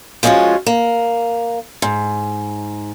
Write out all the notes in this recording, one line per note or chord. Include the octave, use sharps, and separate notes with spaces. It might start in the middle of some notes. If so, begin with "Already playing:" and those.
F3 G#3 C#4 D#4 F4 F#4
A#3
G#2